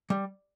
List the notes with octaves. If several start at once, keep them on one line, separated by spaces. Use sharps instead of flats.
G3